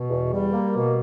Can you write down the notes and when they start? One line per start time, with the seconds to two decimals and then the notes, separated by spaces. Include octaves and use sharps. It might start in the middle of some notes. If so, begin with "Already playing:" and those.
Already playing: B2
0.10 E2
0.31 G3
0.53 A#3
0.74 B2